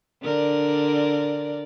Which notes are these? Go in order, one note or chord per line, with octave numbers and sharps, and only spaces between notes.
D3 A#4 D5